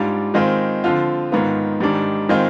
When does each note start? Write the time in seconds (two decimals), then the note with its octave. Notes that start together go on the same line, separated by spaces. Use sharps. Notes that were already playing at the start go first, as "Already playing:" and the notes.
Already playing: G#2 G3 D4 F4
0.34 D#3 G#3 C4 F4
0.84 D3 F3 C4 F4
1.32 G#2 D#3 B3 F4
1.80 G#2 D#3 G3 D4
2.29 D#3 G#3 C4 F4